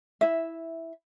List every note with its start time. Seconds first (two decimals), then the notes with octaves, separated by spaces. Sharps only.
0.21 E4 E5